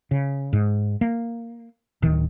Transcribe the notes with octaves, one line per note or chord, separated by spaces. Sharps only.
C#3
G#2
A#3
D1 D#3